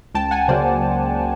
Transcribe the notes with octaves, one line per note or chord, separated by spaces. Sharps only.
C#2 G5 A5
F#5 G#5
C#3 F#3 A#3 C5 D5